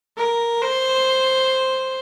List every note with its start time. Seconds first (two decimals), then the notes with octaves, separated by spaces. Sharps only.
0.17 A#4
0.62 C5